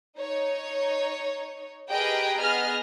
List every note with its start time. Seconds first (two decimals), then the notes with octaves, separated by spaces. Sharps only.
0.19 D#4 C#5
1.90 G4 G#4 A#4 B4 D#5 G5
2.39 B3 G#4 D#5 F6